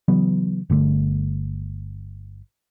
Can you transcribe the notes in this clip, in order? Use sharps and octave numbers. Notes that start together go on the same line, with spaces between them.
C#3 E3 F#3 B3
G1 D3 A3